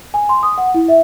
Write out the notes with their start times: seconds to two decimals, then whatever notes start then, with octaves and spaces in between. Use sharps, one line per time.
0.14 G#5
0.29 C6
0.43 D#6
0.58 F#5
0.74 E4
0.88 E5